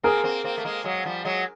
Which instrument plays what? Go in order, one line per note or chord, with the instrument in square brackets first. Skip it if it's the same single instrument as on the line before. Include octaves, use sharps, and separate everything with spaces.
[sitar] A#3 C4 [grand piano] G#4 A#4
[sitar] A#3 C4
A#3 C4
A3
G#3 A#3
F#3 G#3
F3 G3
F#3 G#3